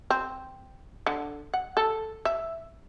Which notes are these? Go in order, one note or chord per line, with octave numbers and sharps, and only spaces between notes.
C4
D3
F#5
A4
E5